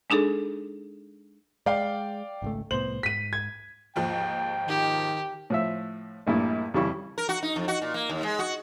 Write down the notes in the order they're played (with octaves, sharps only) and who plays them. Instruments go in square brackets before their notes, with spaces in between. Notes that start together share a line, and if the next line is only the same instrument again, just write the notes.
[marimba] G#3 D4 D#4 G#4 A4
[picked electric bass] G#3 [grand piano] D5 F5 G5
[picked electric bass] G#1 C#2 A3
[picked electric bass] C2 A2 B3 [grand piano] C5 F#7
[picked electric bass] G#2 [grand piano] B6 D#7
[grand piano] G#6
[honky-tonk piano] D#2 G#2 F3 [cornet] G5
[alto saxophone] D#3 [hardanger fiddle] G4
[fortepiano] A2 F3 E5
A#1 G2 A#2 A3 E4
F2 C#3 E3 G3 E4 C#6
[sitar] A#4
F#4
D#4
F2
F#4
A#2
A#3
D#2
G#3
F#4